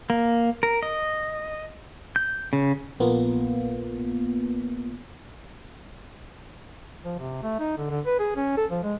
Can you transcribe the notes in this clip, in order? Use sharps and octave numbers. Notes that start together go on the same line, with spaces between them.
A#3
A#4
D#5
G6
C#3
A#1 A#3 B3 F4
F3
C3
A3
D#4
D3
D3
B4
G#4
C#4
A4
F3
G#3